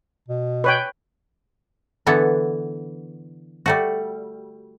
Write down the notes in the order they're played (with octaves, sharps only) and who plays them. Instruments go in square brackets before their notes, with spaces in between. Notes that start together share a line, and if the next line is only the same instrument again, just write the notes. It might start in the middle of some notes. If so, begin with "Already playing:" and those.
[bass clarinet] B2
[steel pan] B4 C#5 G5
[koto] D3 E3 B3 A4
G3 A3 F#4